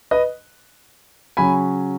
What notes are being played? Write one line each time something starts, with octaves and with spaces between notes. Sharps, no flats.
B4 D#5
C#3 F#3 C#4 G#5 B5